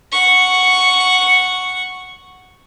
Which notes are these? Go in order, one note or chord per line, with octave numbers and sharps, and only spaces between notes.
F#5 C#6